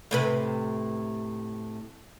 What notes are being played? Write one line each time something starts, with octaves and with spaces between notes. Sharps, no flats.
A2 C3 B4